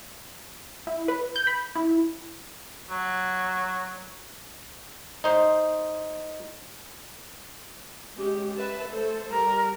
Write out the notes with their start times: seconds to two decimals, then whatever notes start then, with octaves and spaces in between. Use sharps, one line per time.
0.87 E4
1.08 B4
1.36 G6
1.47 B5
1.75 E4
2.90 F#3
5.24 D#4 C5
8.15 G#3 C#4 G4
8.57 B4 E5 A5
8.88 A3 A4 C5
9.31 G3 A#4